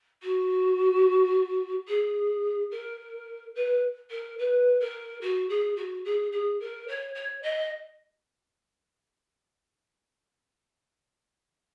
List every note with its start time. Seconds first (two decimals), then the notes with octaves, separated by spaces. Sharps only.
0.22 F#4
1.88 G#4
2.71 A#4
3.55 B4
4.10 A#4
4.38 B4
4.80 A#4
5.21 F#4
5.49 G#4
5.76 F#4
6.04 G#4
6.32 G#4
6.60 A#4
6.88 C#5
7.14 C#5
7.42 D#5